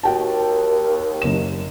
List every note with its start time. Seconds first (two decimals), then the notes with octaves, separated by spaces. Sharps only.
0.03 D#2 F#4 G5 A5
1.22 F#1 E7